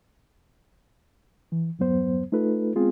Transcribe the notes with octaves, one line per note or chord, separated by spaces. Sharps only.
E3
E2 G2 F#3 B3 C5
A3 D#4 F4 A4 B4
G#3 B3 C4 F4 G#4